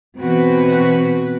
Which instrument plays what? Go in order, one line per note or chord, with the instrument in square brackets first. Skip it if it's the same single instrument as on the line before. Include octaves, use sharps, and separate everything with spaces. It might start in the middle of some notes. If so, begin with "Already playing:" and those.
[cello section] B2 E3 C4 F#4 B4